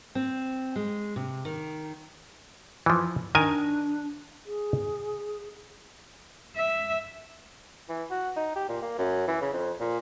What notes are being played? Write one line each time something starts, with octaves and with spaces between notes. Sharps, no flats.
C4
G#3
C3
D#3
E3 F3
D#3 D4 A#4 G#5
G#4
E5
E3
F#4
D#4
G4
A#2
A#3
F#2
E3
C#3
F2
A#2